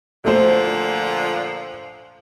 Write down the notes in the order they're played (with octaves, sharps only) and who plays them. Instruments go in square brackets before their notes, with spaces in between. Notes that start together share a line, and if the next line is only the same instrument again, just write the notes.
[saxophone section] A#2 D3 F3 [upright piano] A3 C5